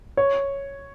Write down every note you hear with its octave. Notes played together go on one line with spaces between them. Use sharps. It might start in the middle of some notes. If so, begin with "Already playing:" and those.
C#5